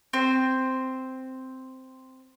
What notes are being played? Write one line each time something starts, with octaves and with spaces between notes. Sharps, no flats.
C4 C5